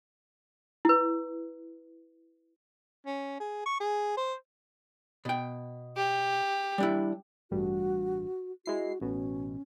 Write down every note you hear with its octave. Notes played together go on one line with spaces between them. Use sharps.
E4 B4
C#4
G#4
C#6
G#4
C5
B2 G5
G4
G3 D4 E4
A1 G2 F#4
G#3 E4 F#4 C7
A1 B2 C#4